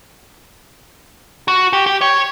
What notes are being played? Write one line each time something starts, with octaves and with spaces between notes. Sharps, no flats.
F#4
G4
G4
C#5